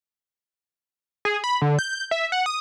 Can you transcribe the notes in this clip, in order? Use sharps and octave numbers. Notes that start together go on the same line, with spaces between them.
G#4
B5
D3
G6
E5
F#5
D#6